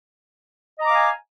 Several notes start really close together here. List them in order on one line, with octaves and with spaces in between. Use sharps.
D#5 A#5 D6 F5 G#5